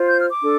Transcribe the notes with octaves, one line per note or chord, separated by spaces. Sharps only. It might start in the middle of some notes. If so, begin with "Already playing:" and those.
Already playing: F4 C5
G6
F6
D6
D4 A4